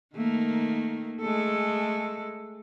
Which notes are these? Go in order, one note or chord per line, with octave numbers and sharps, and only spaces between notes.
D#3 A3 A#3
G#3 A3 A4